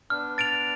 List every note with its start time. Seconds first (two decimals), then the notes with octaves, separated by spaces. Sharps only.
0.10 B3 D4 F6
0.38 A6 D7 F7